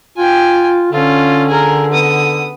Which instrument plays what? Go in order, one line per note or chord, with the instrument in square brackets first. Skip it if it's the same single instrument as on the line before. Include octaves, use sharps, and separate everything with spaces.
[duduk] F4 [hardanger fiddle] G5 G#5
[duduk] D3 [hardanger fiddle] C#4 F4
[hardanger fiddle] G#4 A#4
B3 D#6